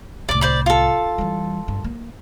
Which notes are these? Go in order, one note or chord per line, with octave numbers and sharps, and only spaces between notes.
C2 A2 D5 D6
C5 D5 B5
F4 A4
E3 G3
G2
A#3